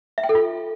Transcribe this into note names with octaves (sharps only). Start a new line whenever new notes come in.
E5
G5
A4
F4